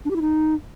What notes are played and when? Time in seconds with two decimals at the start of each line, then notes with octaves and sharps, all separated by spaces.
0.05 D4
0.10 G4
0.16 E4
0.21 D#4